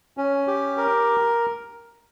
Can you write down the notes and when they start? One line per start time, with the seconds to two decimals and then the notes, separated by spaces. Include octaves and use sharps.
0.17 C#4
0.47 G4
0.77 A#4